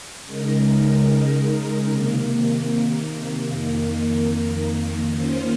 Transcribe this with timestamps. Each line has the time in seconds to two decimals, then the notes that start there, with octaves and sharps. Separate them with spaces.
0.25 C#3 G#3 D#4 A#4
1.87 C3 D#3 A#3
3.49 F2 D#3 A#3
5.11 D#3 A#3 C#4 F4 C5